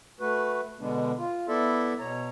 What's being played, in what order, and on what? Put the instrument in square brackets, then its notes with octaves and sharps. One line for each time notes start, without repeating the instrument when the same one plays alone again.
[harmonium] A3 F#4 B4
B2 D3 G#3 B3 D4
F4
B3 E4 A4 D5 E5
B2 C#5 A#5